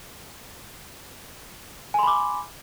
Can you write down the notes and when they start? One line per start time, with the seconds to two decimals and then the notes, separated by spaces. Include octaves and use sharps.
1.94 G#5
1.99 C6
2.03 B5
2.07 D6